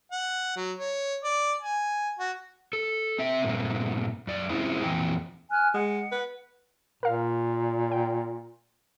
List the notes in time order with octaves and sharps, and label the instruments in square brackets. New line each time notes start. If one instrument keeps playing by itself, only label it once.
[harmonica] F#5
F#3
C#5
D5
G#5
F#4
[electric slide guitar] A4
C4 E5
G2 A#2 A3 A#3 C4
F#2 D5
G#3 C4 C#4 E4 F4
F2 A#2 E3 C4 G5
[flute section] G#5 F6 F#6
[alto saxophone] G#3 [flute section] F#5
[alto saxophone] B4
[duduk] A#2 [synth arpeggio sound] A#4 F5
[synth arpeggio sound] G5